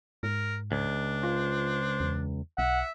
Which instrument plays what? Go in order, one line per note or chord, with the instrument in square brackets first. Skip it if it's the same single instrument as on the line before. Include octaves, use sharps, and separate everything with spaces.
[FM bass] G#2 [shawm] A#4
[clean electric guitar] C#2 [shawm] D4
[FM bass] F4 [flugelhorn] C5
[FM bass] E2
[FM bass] B1 [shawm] E5 [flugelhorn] F#5